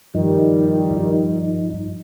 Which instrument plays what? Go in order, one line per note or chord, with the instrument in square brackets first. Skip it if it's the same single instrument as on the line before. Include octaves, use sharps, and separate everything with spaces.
[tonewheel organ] G2 F3 D#4 [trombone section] D#3 G3
[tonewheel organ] G2 F3 D#4